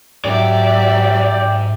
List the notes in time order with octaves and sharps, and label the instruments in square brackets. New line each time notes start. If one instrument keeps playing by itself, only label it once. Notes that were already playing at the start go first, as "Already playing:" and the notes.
[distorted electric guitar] G#2 D#4 [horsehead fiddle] F#3 E5 [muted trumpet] G4 [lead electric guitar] D5